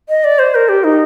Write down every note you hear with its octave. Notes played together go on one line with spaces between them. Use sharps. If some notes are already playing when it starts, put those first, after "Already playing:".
D#5
D5
C5
A#4
G4
D#4